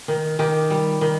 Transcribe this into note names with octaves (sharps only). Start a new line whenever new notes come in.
D#3
D#3 G4
G3
D#3